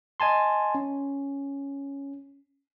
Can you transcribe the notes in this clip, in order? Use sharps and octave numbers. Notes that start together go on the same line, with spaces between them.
D#5 G#5 A5 C6
C#4